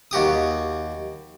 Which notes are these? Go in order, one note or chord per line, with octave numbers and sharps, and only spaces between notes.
D#2 F#4 G4 D#6